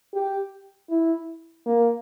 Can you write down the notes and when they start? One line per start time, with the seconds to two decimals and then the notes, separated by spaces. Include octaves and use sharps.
0.14 G4
0.90 E4
1.66 A#3